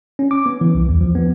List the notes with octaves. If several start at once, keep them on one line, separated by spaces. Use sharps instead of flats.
C#4
D6
B3
E3
C2
E2
F3
B3